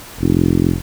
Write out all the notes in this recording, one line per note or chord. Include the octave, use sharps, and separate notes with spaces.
F1